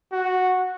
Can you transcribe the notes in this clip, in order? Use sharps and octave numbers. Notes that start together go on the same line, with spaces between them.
F#4